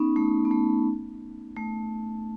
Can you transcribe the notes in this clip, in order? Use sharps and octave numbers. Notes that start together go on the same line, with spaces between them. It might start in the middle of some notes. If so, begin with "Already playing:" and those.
Already playing: B3 C#4 D#4
A3
B3
A3
A3